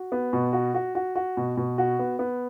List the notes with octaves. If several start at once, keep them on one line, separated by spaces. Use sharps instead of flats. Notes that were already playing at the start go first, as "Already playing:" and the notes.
Already playing: F#4
B3
B2
F#4
F#4
F#4
F#4
B2
B2
F#4
B3
B3